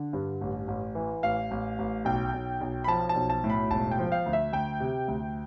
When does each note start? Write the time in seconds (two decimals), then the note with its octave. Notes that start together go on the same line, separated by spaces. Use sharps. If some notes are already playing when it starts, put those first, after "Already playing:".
Already playing: D3
0.13 G2
0.41 A1
0.68 A1
0.95 E3
1.23 A1 F5
1.51 A1
1.79 A1
2.05 B1 G5
2.34 B1
2.61 B1
2.84 B5
2.88 F3 A5
3.09 A5
3.15 B1
3.30 A5
3.44 A2
3.50 B5
3.71 E1 A5
3.91 G5
3.98 F3
4.12 F5
4.26 D2
4.33 E5
4.53 D2 G5
4.80 C3
5.08 D2